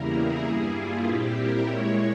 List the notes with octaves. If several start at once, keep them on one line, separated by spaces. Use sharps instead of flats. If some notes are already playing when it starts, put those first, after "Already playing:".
Already playing: E2 C#3 G3 A#3 E4 A#4
G#4
G2 G3 A#3 E4 G#4
F4
A#2 G3 C4 E4 G4
A#4
A#2 G#3 E4 C#5